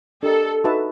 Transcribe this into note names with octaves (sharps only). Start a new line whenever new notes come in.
D4 G4 A4 A#4 D#5
D#4 F#4 B4 E5 A5